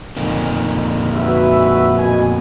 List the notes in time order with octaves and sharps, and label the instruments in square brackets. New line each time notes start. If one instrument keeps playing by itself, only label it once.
[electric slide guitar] F2 A#2 D#3
[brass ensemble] F#4 B4 E5
B2 G#5